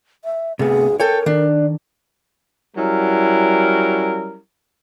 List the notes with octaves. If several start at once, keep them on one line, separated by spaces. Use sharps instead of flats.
E5
D2 G2 C3 A3 B3 G#4
A4 A#4 C#5 G5 G#5
D#3 D4
F#3 G3 C#4 E4 A#4